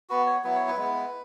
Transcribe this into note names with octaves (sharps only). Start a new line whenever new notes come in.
B3 F#4 B4
C#5
F#3 B3 E4 B4
C#5
B4
G#3 B3 E4